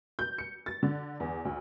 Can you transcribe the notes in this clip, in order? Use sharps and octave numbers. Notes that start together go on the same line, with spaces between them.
G6
C#7
A6
D3
E2
D2